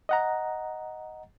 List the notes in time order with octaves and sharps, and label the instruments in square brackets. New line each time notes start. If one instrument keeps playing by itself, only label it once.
[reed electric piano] D#5 F#5 A#5